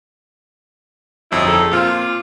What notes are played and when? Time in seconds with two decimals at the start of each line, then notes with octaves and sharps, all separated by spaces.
1.31 G1 F2 F#3 D#4 E4
1.45 D#4 G#4 A4
1.72 A#2 C4 F4